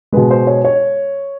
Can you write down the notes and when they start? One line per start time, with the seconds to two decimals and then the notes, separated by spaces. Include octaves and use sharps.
0.13 B2 G#3 B4
0.31 C5
0.47 C#5
0.65 C#5